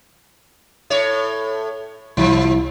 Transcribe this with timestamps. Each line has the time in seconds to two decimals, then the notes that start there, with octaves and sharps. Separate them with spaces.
0.90 A2 C#5
2.17 C2 E3 F3 E4